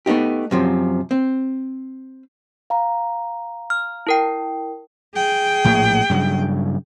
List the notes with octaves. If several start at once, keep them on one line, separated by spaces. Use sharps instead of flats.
A3 B3 C#4 D#4 G4
F#2 C3 F3
C4
F5 A#5
F6
E4 A#4 G5
G#4 G5
A#1 A2 A#3
G2 C#3 F#3